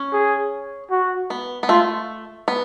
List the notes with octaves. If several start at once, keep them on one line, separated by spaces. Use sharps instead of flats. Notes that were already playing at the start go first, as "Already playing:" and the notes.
Already playing: C#4
G#4
F#4
B3
B3
A3 F4
B3